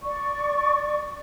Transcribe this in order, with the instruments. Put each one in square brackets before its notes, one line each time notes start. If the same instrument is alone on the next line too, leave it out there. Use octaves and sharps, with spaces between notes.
[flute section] D5 C#6